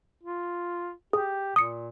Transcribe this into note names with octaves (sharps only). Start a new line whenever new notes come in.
F4
G4 G#4
A#2 D#6 C#7